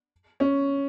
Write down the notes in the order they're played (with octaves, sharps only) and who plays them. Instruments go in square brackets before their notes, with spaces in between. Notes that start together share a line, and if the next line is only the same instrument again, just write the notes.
[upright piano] C#4